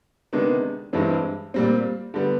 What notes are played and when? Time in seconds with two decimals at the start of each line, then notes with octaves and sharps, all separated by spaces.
0.33 C3 D#3 G#3 B3 D4
0.93 G2 E3 G#3 C4
1.54 A#2 G3 C4
2.14 D3 G3 B3